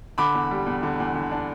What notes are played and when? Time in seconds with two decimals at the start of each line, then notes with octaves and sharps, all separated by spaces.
0.18 D3 B5 D6
0.34 E2
0.51 G3
0.66 E2
0.83 D3
1.00 E2
1.15 D3
1.31 D4